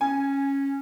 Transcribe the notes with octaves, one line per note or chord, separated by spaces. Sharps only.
C#4 G#5